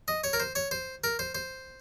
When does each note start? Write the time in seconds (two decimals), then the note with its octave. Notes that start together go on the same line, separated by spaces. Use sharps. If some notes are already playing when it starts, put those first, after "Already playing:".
0.08 D#5
0.24 C#5
0.33 A#4
0.40 C5
0.55 C#5
0.71 C5
1.04 A#4
1.19 C5
1.35 C5